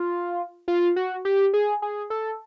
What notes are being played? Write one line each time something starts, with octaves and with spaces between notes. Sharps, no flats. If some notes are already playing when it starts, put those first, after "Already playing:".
Already playing: F4
F4
F#4
G4
G#4
G#4
A4